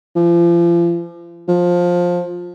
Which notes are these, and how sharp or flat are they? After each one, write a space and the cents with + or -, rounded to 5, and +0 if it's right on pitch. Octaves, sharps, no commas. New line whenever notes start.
F3 -35
F3 +15